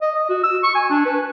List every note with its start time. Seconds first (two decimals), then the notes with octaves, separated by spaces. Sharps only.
0.02 D#5
0.15 D#5
0.29 F#4
0.43 E6
0.64 C#6
0.75 G#5
0.90 D4
1.06 B4